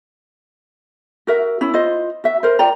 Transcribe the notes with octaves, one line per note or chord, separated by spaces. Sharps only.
F#4 A#4 E5
C#4 E4
F4 C5 D#5
F#4 E5
A#4 C5
F4 D5 G5 A#5